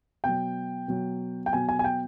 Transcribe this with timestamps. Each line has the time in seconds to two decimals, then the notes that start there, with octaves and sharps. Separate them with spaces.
0.24 B2 F#3 G5
0.88 B2 F#3
1.46 G5
1.53 B2 F#3 G#5
1.69 G#5
1.79 G#5
1.84 G5